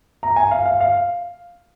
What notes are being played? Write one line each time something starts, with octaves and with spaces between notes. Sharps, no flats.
A#5
G#5
F5
F5
F5